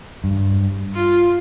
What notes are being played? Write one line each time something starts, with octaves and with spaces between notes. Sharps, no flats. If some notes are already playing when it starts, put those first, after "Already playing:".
G2
F4